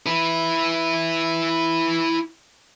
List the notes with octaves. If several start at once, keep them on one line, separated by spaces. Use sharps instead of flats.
E4 B4